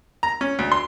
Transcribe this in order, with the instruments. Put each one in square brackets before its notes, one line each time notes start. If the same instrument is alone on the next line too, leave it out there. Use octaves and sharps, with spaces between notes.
[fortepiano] A#5
C#4
D2
C6